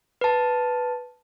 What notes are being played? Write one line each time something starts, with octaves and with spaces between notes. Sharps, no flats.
B4 A5